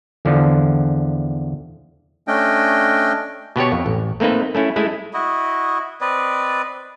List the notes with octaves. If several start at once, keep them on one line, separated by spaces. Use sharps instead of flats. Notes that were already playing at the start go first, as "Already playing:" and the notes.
E2 D3 F3
A3 C#4 D4 D#5 G5
B2 B3 G4 C#5
F2
A1
A3 A#3 C4 D#4 B4
A3 C#4 E4
G#3 A3 E4
E4 F#4 D#5
C4 B4 D5 D#5